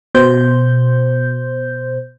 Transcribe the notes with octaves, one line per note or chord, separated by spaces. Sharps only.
B2 C5 G6